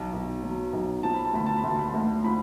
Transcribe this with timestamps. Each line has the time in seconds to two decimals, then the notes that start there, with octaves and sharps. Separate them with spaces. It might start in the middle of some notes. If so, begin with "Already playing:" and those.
Already playing: B1 A5
0.13 B1
0.43 F#3
0.73 B1
1.03 F3 A5
1.14 B5
1.25 A5
1.34 D2 B5
1.46 A5
1.57 B5
1.64 D2 A5
1.79 B5
1.89 D2 A5
2.24 F3 B5